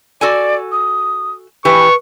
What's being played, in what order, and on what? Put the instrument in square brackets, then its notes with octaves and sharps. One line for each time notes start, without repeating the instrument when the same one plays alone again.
[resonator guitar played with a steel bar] F#4 A4 G#5 [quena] D5
[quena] D#6
[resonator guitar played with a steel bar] E3 G4 [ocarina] B4 [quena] G#5 [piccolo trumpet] C#6